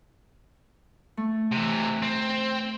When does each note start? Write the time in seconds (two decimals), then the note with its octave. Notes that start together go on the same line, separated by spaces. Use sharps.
1.17 A3
1.52 C3 E3
2.02 C4